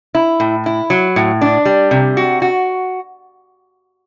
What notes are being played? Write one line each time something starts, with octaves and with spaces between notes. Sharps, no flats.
E4
A2
E4
F#3
A2
D4
G3
C3
F#4
F#4